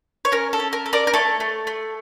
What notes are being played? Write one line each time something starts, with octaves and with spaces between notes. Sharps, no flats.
C#5
C#4 A#4
A4
C#4
A#4
A4
A#4 D5
A#4
A3 A4 C#5
A3
A3